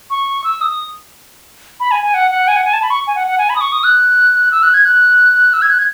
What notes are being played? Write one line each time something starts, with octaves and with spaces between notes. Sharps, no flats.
C#6
E6
D#6
B5
G#5
G#5
F#5
F#5
G#5
F#5
G#5
A5
B5
C#6
G#5
F#5
F#5
G#5
B5
D#6
C#6
D#6
F#6
E6
F#6
G#6
F#6
E6
G#6
F#6
G#6